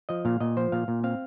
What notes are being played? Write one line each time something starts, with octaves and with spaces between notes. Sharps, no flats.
F3 D#5
A#2 F5
A#2 D#5
F3 C5
A#2 F5
A#2
C4 F5